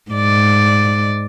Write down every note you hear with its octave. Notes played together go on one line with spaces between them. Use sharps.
G#2 D5